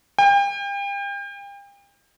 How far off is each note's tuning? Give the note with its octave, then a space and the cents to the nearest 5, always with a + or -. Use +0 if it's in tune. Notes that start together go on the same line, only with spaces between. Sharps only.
G5 +35